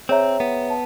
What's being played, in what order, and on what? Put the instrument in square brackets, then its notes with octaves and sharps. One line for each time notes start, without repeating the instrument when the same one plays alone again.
[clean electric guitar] C4 [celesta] G#4 C#5 E5 G5 A#5
[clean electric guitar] B3
[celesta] A5